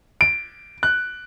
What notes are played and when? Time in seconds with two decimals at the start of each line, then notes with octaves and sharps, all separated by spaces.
0.21 D7
0.83 F#6